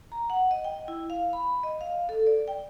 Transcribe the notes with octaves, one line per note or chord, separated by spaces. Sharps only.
A#5
F#5
D#5
G5
E4
F5
B5
D#5
F5
A4
D5
G5